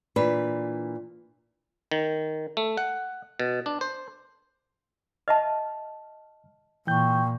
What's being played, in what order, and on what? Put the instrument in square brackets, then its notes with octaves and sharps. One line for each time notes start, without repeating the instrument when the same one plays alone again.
[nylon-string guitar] A#2 E3 D4 B4
[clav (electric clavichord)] D#3
A3
F#5
B2
D4
C5
[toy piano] D#5 E5 A5 [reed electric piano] F6
[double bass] A#2 [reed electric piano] E3 G6 [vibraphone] G5 C#6